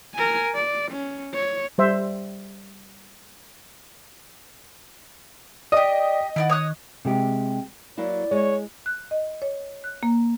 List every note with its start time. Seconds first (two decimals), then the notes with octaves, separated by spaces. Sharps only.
0.14 A#4 G#5
0.55 D5
0.92 C#4
1.34 C#5
1.78 G3 C5 E5
5.72 G4 D5 D#5 D#6
6.36 D#3 E4 D5 F#5
6.49 C#5 D#6 F#6
7.05 C3 G#3 G4
7.98 F#3 A#3 E4 D5
8.31 G#3 C#5
8.86 F#6
9.11 D#5
9.42 C#5
9.84 F#6
10.03 A#3